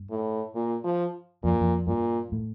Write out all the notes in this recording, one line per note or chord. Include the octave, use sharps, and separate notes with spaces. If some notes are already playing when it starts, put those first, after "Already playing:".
Already playing: G2
A2
A#2
F3
F2 A#2
F2
G2 A#2
A2